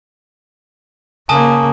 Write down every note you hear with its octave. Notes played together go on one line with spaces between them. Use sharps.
C#3 A#3 G#5 A5 D#6